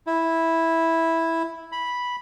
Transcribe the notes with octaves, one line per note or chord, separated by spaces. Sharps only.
E4
B5